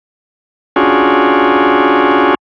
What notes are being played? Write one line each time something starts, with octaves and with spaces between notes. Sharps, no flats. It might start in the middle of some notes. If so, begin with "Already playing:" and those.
C#4 D4 F4 F#4 G#4